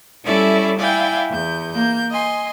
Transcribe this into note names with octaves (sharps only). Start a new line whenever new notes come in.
G3 C#4 E4 A4 D5 E5
E4 D5 F5 G5 G#5
E2 G6
A#3 G6
D#5 G#5 C6